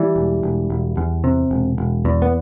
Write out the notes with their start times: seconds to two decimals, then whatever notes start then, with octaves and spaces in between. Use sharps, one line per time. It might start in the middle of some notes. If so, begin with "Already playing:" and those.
Already playing: E3 G3
0.16 E1
0.43 E1
0.70 E1
0.97 E2
1.24 C3
1.51 E1
1.78 E1
2.05 E2
2.22 B3